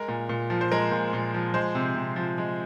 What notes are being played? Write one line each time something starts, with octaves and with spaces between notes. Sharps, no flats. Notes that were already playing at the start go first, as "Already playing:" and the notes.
Already playing: G#3 A#4
A#2
A#2
F3
C5
G#3 A#4
A#2
A#2
F3
G#3 C5
C3
C3
F3
G#3